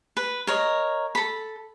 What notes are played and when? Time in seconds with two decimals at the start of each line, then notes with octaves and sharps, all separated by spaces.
0.17 B4
0.47 A#4 C#5 D#5
1.15 A4 B5